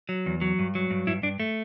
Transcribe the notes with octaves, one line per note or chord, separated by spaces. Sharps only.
F#3
E2
F#3
G2
F#3
G2
G2 E4
G2 D4
A3